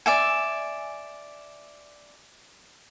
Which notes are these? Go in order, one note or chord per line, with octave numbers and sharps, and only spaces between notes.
D5 E5 G#5